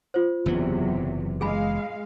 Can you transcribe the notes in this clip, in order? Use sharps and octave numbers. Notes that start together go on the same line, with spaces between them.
F4 C5
F#1 E2 C3 E3 F#3 B3
G#3 G#4 F5 G#5 B5